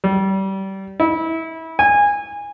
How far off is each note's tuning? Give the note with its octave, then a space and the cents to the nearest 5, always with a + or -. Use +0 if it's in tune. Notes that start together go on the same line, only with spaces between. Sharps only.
G3 -25
E4 -25
G#5 -20